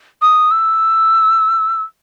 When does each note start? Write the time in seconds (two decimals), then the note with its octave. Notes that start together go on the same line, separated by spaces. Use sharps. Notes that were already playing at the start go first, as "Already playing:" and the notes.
0.22 D#6
0.51 E6